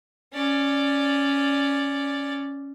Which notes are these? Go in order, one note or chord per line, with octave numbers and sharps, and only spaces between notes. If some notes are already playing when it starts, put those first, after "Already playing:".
C#4 D5